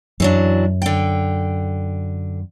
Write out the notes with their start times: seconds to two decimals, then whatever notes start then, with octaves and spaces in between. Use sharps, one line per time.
0.20 F#2 E3 F#3 D4
0.82 D3 G5